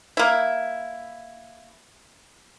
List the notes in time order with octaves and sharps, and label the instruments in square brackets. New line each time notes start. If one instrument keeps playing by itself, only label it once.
[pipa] A#3 E4